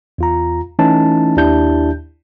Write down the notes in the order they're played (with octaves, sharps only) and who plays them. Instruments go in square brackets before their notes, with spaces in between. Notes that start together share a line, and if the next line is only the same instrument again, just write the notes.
[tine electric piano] E2 F4 A#5
E3 A3 C#4 D#4 E4 A5
D#2 D4 E4 G4 A5 G6